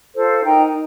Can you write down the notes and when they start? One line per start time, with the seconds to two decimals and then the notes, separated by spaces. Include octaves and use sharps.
0.14 F4 A4 C5
0.43 D#4 A#4 G5 A#5